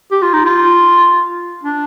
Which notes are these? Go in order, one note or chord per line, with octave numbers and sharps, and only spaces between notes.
G4
F4
D#4
F4
D4